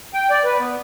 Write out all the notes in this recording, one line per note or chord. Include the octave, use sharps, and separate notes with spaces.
G5
D5
B4
B3